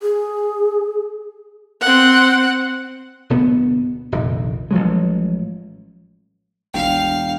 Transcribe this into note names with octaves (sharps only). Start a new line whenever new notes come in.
G#4
C4 F#5
D1 B2 B3
F1 A#1 D#3
A1 F3 F#3 G#3
E1 A1 D4 F5 G5